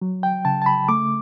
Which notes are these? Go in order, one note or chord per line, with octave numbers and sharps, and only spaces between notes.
F#3
G5
C#3 A5
A5
B5
A3 D6